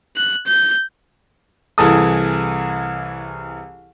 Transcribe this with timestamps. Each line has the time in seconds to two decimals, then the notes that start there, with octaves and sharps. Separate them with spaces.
0.16 F#6
0.46 G6
1.78 C2 E3 G#4 A4 A5 D#6